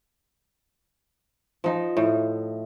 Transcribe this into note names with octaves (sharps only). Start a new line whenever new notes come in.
F3 D#4
A2